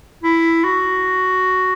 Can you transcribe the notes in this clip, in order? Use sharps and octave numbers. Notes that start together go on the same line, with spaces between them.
E4
F#4